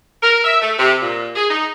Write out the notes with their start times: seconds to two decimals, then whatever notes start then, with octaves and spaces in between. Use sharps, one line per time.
0.23 A#4
0.44 E5
0.62 A3
0.79 C3
1.01 A#2
1.36 G#4
1.49 D#4